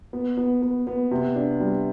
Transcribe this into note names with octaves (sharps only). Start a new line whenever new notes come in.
B3
B3
B3
B3
C3
D4
G3